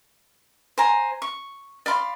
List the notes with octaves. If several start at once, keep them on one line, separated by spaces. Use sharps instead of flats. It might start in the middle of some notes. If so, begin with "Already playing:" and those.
C5 G#5 A#5
C#6
D5 F5 B5 C6